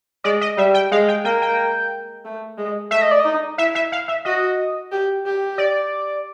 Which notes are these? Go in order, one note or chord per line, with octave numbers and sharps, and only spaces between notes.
G#3 D5
D#5
G3 E5
G5
G#3 F5
G5
A#3 G5
G5
A3
G#3
A3 E5
D#5
D5
D#4 D#5
E4 E5
E5
F5
E5
F#4 D#5
G4
G4
D5